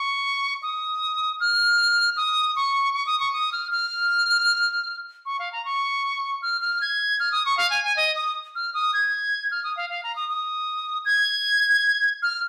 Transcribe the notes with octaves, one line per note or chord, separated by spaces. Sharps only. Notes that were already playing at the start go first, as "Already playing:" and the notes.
Already playing: C#6
D#6
F6
D#6
C#6
C#6
D#6
C#6
D#6
F6
F6
C#6
F5
A#5
C#6
F6
F6
G#6
F6
D#6
C#6
F5
G#5
G#5
D#5
D#6
F6
D#6
G#6
F6
D#6
F5
F5
A#5
D#6
D#6
G#6
F6